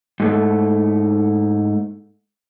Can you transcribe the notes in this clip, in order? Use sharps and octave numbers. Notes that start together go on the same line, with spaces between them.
G#2 A3